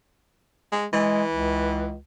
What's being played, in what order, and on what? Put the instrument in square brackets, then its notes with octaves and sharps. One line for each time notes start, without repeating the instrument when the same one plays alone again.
[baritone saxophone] G#3
[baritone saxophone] E3 [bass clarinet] G#3
[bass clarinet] C#2